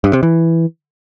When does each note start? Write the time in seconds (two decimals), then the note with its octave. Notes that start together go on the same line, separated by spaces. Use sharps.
0.04 G2
0.13 C3
0.23 E3